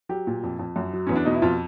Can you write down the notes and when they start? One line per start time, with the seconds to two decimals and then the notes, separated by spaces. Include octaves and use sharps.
0.09 F#3 G4
0.27 A#2
0.43 F2
0.59 F2
0.76 F#2
0.93 F#3
1.07 E2 C#4
1.16 D4
1.25 B2 D#4
1.34 E4
1.42 F2 F4